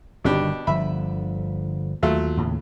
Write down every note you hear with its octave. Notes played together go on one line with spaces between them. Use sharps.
G1 B2 D#3 D4 G4
G1 D3 F3 E5 B5
D#2 F#3 A3 F4
D#2 A2 C#3